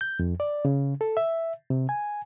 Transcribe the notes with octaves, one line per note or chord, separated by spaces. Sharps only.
G6
F2
D5
C#3
A4
E5
C3
G#5